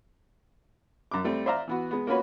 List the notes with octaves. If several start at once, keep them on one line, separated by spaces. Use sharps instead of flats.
F#2 D6
G3 A3 C4
C5 D5 E5 F5 A#5
E3 B3 F#4
G#3 B3
A#3 C#4 F4 F#4 B4 C#5